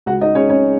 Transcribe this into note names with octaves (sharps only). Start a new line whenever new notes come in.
C#2 F#4 F#5
D#4 D#5
C#3 G#3 C#4 C#5
C#4 C#5